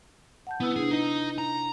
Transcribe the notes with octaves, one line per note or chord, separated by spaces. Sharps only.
F#5 A5 G6
B3 E4 B4 E6
C3 D4 G#4
D#4 D#5
A#5